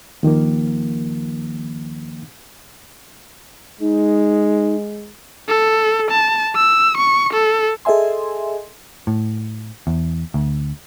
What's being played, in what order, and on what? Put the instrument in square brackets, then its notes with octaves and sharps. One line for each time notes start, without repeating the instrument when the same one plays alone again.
[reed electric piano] D#2 D#3 F3 A#3
[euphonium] G#3 [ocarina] D#4
[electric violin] A4
A5
E6
C#6
A4
[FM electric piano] G#4 A4 D#5 E5 G#5 C6
[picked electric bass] A2
E2
D2